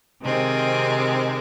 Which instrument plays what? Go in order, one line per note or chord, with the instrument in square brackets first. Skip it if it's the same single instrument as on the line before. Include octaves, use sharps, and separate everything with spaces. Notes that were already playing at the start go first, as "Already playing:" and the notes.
[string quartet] C3 D#3 G#3 C4